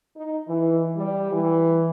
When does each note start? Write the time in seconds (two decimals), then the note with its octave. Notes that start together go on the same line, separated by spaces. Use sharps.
0.17 D#4
0.48 E3
0.97 G3
1.32 E3